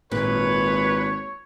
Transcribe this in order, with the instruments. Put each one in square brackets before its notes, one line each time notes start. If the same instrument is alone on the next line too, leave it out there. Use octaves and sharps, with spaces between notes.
[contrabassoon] G#1 [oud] A#2 [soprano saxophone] B4 [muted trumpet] C#5